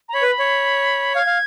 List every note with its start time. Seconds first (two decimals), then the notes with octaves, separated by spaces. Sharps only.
0.09 A#5
0.14 C#5 B5
0.22 B4
0.39 C#5
1.16 F5 G#6
1.26 F5